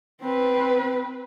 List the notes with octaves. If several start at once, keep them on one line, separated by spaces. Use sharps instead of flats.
C4 B4